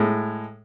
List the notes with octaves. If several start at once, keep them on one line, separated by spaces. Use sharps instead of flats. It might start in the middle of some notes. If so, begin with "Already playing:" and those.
Already playing: A2 G#3